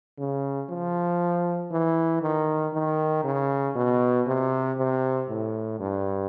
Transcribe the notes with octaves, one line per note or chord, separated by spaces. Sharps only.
C#3
F3
E3
D#3
D#3
C#3
B2
C3
C3
A2
G2